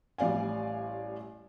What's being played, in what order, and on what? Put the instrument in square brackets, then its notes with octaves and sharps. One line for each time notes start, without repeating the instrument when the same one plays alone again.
[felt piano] A1 G3 D5 F5 G#5